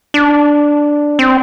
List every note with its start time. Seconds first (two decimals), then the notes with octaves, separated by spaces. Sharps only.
0.14 D4
1.19 C4